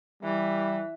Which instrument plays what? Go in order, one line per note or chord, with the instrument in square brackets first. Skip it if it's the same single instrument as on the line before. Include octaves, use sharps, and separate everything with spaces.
[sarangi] E3 [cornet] G3